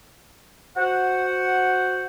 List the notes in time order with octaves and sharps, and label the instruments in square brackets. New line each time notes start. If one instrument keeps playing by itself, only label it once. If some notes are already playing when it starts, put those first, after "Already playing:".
[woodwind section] F#4 C5 F#5